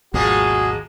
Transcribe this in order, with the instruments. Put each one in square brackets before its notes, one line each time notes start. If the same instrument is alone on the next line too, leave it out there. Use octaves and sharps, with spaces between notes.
[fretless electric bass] G#1 D#2 B2 [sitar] F3 G#3 A#3 [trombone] F#4 [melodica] G#4